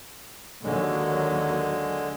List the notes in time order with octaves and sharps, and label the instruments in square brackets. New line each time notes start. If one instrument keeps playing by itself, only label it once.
[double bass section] D#2 F#3 [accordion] D3 G#3